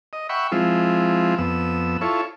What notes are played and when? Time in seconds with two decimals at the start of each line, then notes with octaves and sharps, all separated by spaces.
0.13 D#5
0.29 E5 F#5 G5 B5 C#6
0.52 F3 G#3 C4 E4 F4
1.38 F2 B3 E6
2.01 E4 F4 A4 C#5